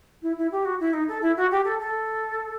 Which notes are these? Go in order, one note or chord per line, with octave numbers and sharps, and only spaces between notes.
E4
E4
G4
F#4
E4
D#4
A4
E4
F#4
G4
A4
A4